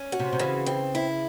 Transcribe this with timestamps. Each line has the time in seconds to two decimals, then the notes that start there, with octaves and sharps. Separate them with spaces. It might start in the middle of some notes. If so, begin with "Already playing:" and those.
Already playing: C#4
0.12 F#4
0.19 C3
0.32 C3
0.39 C#3 E3
0.66 C4
0.95 E4